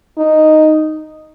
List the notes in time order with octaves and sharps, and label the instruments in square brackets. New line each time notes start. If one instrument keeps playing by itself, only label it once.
[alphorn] D#4